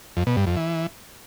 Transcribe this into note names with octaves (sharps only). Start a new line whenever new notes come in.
F2
B2
G2
F2
E3